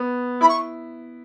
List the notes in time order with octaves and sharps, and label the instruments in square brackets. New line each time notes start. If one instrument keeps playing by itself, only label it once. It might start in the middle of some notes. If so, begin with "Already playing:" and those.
Already playing: [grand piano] B3
[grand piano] E4 [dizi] B5
[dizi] C#6